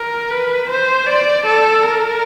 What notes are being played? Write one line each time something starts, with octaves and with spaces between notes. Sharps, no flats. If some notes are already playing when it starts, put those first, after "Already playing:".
Already playing: A#4
B4
C5
D5
A4
A#4